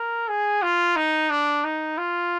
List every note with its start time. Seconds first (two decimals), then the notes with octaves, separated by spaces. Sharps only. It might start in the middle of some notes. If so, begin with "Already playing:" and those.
Already playing: A#4
0.28 G#4
0.62 F4
0.96 D#4
1.30 D4
1.64 D#4
1.98 F4